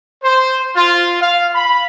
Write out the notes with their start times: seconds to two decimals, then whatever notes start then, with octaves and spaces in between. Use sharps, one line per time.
0.23 C5
0.76 F4
1.21 F5
1.55 B5